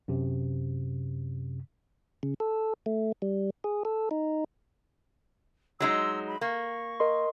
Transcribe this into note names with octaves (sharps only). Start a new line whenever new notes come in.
F#2 C3
C#3
A4
A3
G3
G#4
A4
D#4
F#3 G#3 D#4 E6
B5
A#3 C#6
A#4 D#5 C6